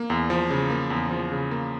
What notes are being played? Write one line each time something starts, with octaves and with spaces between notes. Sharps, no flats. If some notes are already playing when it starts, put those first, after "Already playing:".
Already playing: A#3
E2
F3
C#3
A#3
E2
F3
C#3
A#3